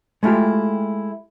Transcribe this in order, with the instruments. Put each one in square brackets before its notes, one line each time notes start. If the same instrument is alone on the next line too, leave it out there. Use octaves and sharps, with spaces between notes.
[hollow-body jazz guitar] G#3 A3 E4 F4 G4